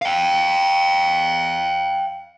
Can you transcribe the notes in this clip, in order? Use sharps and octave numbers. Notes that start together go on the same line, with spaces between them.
F5 G5